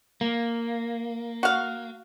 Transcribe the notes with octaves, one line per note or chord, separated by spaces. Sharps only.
A#3
F#4 F5